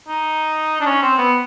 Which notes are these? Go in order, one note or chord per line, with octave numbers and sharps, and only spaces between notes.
D#4
D4
C#4
C4
B3